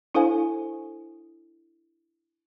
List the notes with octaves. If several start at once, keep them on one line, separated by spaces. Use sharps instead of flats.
D4 E4 A4 C5 F5 G#5